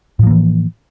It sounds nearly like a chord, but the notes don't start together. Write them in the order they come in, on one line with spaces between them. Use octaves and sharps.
A2 F3 A#3 E3